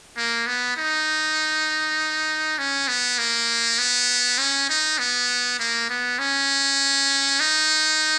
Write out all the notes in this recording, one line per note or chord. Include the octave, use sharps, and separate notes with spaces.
A#3
B3
D#4
C#4
B3
A#3
B3
C#4
D#4
B3
A#3
B3
C#4
D#4